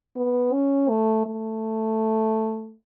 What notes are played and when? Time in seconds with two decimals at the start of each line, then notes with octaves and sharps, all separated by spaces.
0.16 B3
0.53 C#4
0.89 A3
1.26 A3